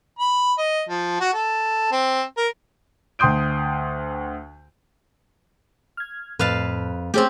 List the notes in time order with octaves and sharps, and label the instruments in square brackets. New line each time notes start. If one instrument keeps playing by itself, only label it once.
[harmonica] B5
D#5
F3
F#4
A4
C4
A#4
[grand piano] D2 G5 C6 D#6 G6 D7
[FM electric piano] F6 G#6
[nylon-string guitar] F2 [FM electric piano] A2 [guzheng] B4 F5 A5
[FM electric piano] A3 G#4 C5 [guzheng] C4 C#4 G4